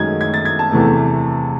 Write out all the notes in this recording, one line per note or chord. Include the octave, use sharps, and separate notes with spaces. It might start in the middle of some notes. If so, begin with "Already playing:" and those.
Already playing: F#2 D#3 G#3 G#6
G#6
A6
G#6
A5
E2 C3 E3 A3